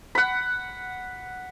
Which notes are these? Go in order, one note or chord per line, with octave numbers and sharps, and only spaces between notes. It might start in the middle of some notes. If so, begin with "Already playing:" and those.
F#5 B5